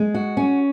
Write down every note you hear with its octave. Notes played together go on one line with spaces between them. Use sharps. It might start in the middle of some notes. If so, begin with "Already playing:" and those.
Already playing: G#3
F#4
C#4